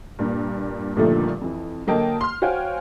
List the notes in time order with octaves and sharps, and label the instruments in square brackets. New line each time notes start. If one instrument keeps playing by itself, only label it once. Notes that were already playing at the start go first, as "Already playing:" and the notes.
[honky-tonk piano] G2 A#2
G2 A#2 D3 D#3 F3 A3
F2 E3
D3 F#3 A#3 D#5 G5 A5
C6 F6
F#4 C5 C#5 F5 G5 G#5